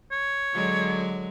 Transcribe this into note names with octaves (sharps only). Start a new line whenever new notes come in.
C#5
D3 F#3 G#3